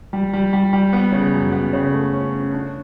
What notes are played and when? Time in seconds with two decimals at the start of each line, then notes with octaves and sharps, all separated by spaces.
0.13 G3
0.33 G3
0.53 G3
0.73 G3
0.93 B3
1.12 C#3
1.33 F#2
1.52 B3
1.73 C#3
1.93 A3
2.13 C#4
2.33 C#4
2.53 D4